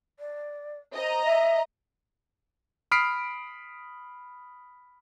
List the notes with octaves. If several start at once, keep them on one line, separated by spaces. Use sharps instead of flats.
D5
C5 D#5 A#5
E5
B5 D#6 F6 B6 C7 D7